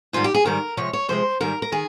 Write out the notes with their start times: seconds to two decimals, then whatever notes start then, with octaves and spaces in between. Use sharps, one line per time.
0.13 G#2 D#3 G3 F4
0.24 G4
0.34 G#4
0.45 G#2 D#3 G3 A#4
0.77 C3 F3 G#3 C#5
0.93 C#5
1.08 C3 F3 G#3 C5
1.40 G#2 D#3 G3 A#4
1.62 A#4
1.72 D#3 G#4